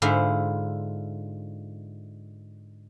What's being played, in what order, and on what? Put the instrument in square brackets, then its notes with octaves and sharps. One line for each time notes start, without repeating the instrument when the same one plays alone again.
[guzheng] G#2 D3 E4 F4 E5